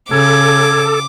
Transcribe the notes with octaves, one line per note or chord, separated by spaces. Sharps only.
C#3 A4 D6 G#6